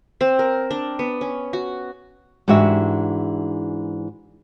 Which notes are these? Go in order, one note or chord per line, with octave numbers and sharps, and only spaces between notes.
C4
A#4
D4
B3
C#4
F#4
G#2 E3 D4 F#4 G4 E5